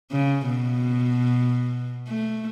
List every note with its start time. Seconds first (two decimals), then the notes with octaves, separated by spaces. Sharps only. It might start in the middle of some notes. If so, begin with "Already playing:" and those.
0.12 C#3
0.47 B2
2.08 A3